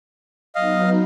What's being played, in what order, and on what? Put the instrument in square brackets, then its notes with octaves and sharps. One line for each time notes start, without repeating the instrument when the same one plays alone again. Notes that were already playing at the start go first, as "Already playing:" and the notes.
[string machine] F#3 B3 D#4 [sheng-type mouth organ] D#5 F5